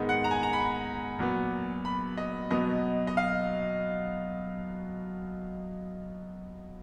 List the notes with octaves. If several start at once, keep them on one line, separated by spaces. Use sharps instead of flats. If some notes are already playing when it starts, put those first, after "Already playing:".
Already playing: G#2 D#3 G#3 B3
F#5
A#5
G#5
A#5
B5
A#2 F#3 B3
B5
D#5
B2 F#3 B3 D#5
D#5
F5